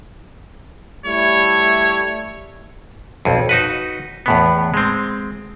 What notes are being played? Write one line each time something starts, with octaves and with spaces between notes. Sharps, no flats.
G3 A3 E4 C#5
B1 F2
D#4 F#4 B4
E2 A2 B3
G#3 C4